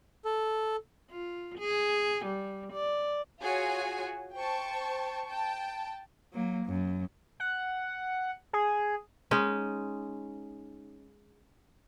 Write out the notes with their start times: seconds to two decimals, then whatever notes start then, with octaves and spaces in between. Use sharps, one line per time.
0.25 A4
1.11 F4
1.59 G#4
2.25 G3
2.73 D5
3.40 F4 F#4 G#4 C#5 G#5
4.36 C5 G5 A5 C#6
5.27 G5 A5
6.33 F#3 A#3
6.66 F#2
7.40 F#5
8.53 G#4
9.31 G#3 C#4 D#4